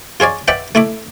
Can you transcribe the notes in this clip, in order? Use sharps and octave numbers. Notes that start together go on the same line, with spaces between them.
F4 G#4 C#5 D5
B4 D5 E5 F#5 G5 B5
A3 E4 E5 D6